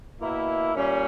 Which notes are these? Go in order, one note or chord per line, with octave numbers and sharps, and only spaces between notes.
B2 A#3 E4 A#4
A#2 G3 C#4